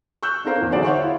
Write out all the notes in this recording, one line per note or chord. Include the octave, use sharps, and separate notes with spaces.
C#6 E6 F#6 G6
C4 D4 A4 A#4 C5 F5
E2 A#2 D#3
D3 F#3 D#4 G#4 C5 D5
C5 C#5 E5 F#5 C6 C#6
E4 F4